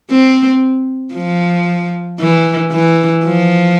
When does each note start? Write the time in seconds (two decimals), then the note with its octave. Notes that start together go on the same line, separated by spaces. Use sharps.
0.10 C4
1.14 F3
2.19 E3
2.72 E3
3.25 F3